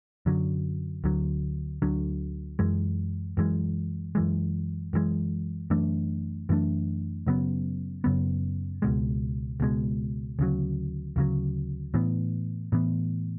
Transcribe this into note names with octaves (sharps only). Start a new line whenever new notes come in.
F#2 D3 F#3
D2 D3 F#3
D2 D3 F#3
F#2 E3 G#3
F#2 E3 G#3
F#2 E3 G#3
F#2 E3 G#3
F#2 E3 A3 D4
F#2 E3 A3 D4
F#2 C#3 F#3 B3
F#2 C#3 F#3 B3
C#2 B2 G#3
C#2 B2 G#3
D2 C#3 F#3
D2 C#3 F#3
A2 E3 B3
A2 E3 B3